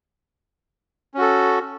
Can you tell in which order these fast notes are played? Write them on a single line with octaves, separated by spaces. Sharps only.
C#4 F#4 A4